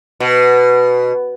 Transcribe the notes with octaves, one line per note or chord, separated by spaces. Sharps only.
B2